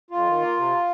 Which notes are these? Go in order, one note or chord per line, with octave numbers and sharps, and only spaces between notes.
F2 F4
D#3
A#3
C3